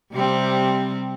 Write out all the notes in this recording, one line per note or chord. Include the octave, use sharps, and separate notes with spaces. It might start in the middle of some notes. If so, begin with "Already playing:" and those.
C3 G3 C4